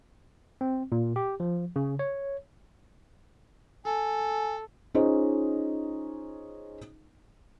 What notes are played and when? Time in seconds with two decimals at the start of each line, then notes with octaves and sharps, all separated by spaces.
0.61 C4
0.92 A#2
1.16 G4
1.40 F3
1.76 C#3
1.99 C#5
3.85 A4 G#5
4.94 C#4 D#4 F4 G#4 C5 D#5